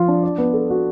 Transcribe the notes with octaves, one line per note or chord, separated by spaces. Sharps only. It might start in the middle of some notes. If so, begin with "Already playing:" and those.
Already playing: F3 F4
D4
D5
B3
A4
F#4